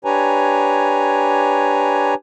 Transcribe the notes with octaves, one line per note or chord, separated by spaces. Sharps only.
D4 G4 B4 C#5 G#5 A#5